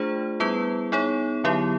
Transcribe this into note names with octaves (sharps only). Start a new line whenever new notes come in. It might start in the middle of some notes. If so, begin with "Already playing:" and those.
Already playing: A3 D4 F4 G#4 C5
G3 B3 E4 G#4 B4
B3 D#4 G#4 C#5
D3 F#3 B3 E4 G4